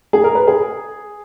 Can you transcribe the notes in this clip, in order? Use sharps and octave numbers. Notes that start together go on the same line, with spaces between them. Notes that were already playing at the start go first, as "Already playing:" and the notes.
G#4
A#4
B4
G#4